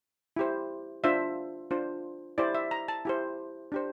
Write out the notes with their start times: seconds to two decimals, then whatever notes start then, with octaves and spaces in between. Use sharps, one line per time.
0.37 E4 G4 C5
1.04 D4 F4 C5 E5
1.71 D4 F4 C5
2.38 E4 G4 C5 D5
2.55 E5
2.71 A#5
2.88 A5
3.05 E4 G4 C5
3.72 D4 G4 C5